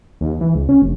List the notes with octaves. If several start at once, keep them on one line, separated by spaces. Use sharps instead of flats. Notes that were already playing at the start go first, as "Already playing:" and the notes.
D#2
E3
C#2
C#4
F1